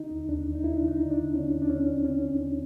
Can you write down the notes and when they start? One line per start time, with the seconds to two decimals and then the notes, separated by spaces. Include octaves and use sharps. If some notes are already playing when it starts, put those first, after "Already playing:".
Already playing: D3 D#4
0.11 D#2
0.29 D#2 D4
0.46 D#2
0.55 D#4
0.63 D#2 E4
0.77 D3 D4
0.88 D#4
0.99 D3
1.11 D4
1.17 D3
1.34 D3 C#4
1.52 D#2
1.62 D4
1.70 D#2 C#4
1.87 D#2
1.99 C4
2.05 D3 C#4
2.22 D#2
2.40 D#2